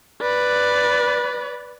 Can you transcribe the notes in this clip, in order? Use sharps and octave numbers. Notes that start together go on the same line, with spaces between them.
B4 D5